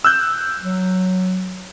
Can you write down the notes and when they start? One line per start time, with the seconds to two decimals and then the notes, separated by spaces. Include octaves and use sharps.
0.04 E6 F#6 G6
0.60 F#3